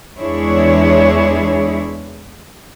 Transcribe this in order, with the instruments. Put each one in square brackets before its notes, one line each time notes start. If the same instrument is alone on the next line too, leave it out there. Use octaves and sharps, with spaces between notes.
[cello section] E2 G#3 D4 E4 G#4 C#5